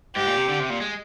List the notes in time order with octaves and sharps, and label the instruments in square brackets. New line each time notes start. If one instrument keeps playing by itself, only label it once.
[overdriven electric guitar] G#2 [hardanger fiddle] G4
[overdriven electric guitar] A#2
C3
D3
C3
A#2
G#3